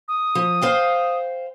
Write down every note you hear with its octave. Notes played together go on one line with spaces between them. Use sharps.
D#6
F3
C5 F5 G5